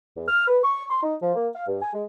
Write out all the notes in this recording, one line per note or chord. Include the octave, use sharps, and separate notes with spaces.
E2
F6
B4
C#6
C6
D#4
F3
A#3
F5
G2
G#5
G#3